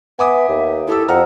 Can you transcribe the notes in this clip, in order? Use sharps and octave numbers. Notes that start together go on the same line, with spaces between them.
B3 E5 G#5 D6 D#6
D#2
E4 G4 A4 E6
F2 F#5 A#5 F6